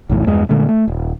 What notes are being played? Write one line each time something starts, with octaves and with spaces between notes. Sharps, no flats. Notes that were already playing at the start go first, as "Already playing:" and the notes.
B1 F#2 A2 E3
E2 G2 G#3
A#2 D3 G#3 A3
A3
D#1